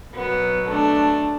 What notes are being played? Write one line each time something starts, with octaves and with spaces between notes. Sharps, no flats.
B2 F#3 B3
A3 D4